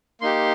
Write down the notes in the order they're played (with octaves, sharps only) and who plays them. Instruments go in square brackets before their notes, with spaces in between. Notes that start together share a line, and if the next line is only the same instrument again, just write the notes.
[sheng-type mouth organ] A#3 D#4 G4 C6